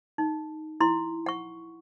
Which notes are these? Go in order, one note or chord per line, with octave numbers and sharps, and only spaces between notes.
D#4
E4 C6
F#5 C#6